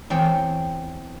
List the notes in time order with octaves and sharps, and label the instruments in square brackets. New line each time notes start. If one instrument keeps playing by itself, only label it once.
[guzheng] E2 C4 C#5 G5